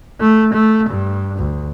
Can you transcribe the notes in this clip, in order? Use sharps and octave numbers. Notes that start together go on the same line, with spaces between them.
A3
A3
G2
D2